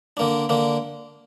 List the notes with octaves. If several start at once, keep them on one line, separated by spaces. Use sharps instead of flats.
D3 A#3 D4
D3 A#3 D4